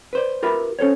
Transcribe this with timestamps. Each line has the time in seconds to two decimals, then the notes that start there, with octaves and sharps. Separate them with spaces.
0.13 B4 C5 D5
0.43 F4 G4 A#4 B4 E5 B5
0.79 C#4 A4 C5 C#5